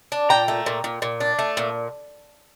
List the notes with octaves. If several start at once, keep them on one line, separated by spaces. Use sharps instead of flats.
D4
A#2 G5 A#5
A3
A#2
A#2
A#2
D4
A3
A#2